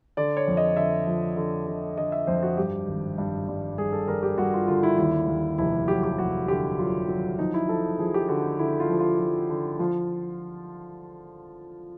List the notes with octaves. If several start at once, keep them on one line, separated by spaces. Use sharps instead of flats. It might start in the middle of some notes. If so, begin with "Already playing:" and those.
D3 D5
C#5
F2
D#5
D3 E5
F3
D3
D3
D3 D#5
E5
F2 C5
F#4
G2 G4
G#1
G2
G3
G2 G#4
A4
G3 A#4
G4
G3 F#4
F4
D3 F4
E4
D#2 E4
D#2
F1 E4
F#3 G4
G4
F1 F#4
D3 G4
F#3 F4
F#3
F3 D#4
E4
F3 A4
F3 G#4
G4
D3 F#4
D3 E4
F4
F3
F4
F3
D3
F3 F4